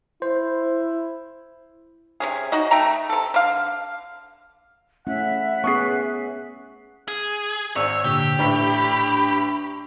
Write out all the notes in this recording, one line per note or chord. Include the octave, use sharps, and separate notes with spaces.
E4 C5
C3 C#4 G#4
D#4 F#4 D#5
A3 G5 A#5
C3 A4
D3 F5
A3 C#4 E4 E5 F#5
B3 C#4 G#4 C#6 D#6 C7
G#4
G#1 C#5 D5 E6
A#2 D3 G4
A1 A2 D4 A#5 B5